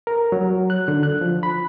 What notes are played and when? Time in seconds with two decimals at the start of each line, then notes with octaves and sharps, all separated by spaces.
0.07 A#4
0.32 F#3
0.70 F#6
0.88 D3
1.03 F#6
1.21 F3
1.43 B5